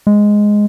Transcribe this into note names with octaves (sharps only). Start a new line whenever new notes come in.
G#3